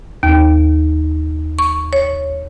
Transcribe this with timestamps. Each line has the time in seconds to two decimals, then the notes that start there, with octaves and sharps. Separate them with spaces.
0.23 D#2
1.59 C#6
1.93 C#5